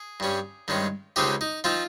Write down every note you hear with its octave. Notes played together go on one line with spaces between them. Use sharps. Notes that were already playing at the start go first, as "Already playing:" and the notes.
Already playing: G#4
G2 G3 C#4
G2 D#3 G#3 C#4
C#2 C#3 G#3 C4 D#4 G4
D#4
F3 C4 D#4 F4